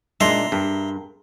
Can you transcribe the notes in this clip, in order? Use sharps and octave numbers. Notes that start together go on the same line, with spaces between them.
A#2 G#3 D4 D#4 E5 A#5 C6
G2 A#4